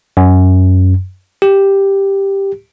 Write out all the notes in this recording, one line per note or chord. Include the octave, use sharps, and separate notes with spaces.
F#2
G4